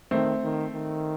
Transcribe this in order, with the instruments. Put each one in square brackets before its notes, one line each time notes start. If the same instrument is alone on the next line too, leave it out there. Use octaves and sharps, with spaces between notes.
[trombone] D#3 [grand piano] A3 C4
[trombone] D#3
D#3